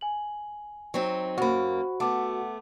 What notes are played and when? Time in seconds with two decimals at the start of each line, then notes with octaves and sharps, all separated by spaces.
0.01 G#5 F#7
0.94 F#3 C4 D#4
1.38 F#2 A#3 F#4 C5 B5
2.00 A3 B3 F#5 A5 D6